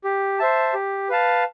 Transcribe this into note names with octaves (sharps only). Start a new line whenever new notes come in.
G4
C5 E5 A5
G4
B4 F5 A5